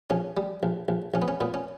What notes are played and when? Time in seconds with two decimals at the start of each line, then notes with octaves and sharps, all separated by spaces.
0.10 A#1 C#4
0.37 G3
0.63 A#1
0.88 A#1
1.14 A#1 C#4
1.22 B3
1.28 C#4
1.41 A#2 B3
1.54 C#4